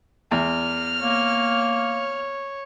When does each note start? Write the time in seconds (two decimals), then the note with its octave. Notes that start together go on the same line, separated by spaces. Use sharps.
0.31 E2 F6
1.01 A#3 C#5